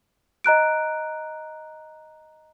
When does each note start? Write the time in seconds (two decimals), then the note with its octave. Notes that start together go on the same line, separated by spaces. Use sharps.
0.44 D#5 A#5 F#6 D7